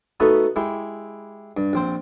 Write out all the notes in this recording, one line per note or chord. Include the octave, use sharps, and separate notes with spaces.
A3 B3 D#4 F#4 A4
G#3 E4 G4
G2
A#1 C4 C5